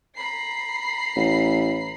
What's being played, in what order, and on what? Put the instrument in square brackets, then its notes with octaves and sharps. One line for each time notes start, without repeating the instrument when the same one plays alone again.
[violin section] A#5 B5 C7
[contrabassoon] A1